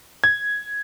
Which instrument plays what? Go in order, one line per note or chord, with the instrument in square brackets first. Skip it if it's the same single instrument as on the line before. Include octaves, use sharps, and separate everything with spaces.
[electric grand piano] G#6